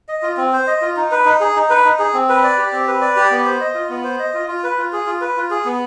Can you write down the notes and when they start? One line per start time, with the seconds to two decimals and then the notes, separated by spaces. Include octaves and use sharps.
0.09 D#5
0.23 F4
0.37 C4
0.53 C5
0.67 D#5
0.82 F4
0.97 D#4
1.11 B4
1.25 D#4
1.40 G#4
1.56 D#4
1.70 B4
1.85 D#4
1.99 G#4
2.14 C4
2.29 B4
2.43 D5
2.58 G4
2.72 C4
2.87 B4
3.01 D5
3.16 G4
3.31 B3
3.45 C5
3.61 D#5
3.74 F4
3.89 B3
4.04 C5
4.19 D#5
4.34 F4
4.48 F4
4.64 B4
4.78 F4
4.93 G#4
5.06 F4
5.21 B4
5.37 F4
5.51 G#4
5.65 B3